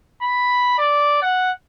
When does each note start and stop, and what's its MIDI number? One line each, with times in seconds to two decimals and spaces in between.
0.22 0.76 83
0.78 1.20 74
1.22 1.51 78